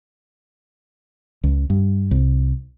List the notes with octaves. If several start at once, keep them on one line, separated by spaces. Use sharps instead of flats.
C#2
G2
C2